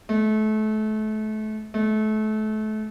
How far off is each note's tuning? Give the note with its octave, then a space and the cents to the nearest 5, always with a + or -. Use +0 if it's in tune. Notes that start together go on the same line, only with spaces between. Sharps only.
A3 -30
A3 -30